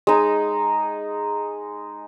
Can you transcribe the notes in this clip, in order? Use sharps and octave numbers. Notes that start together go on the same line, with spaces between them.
G#3 D#4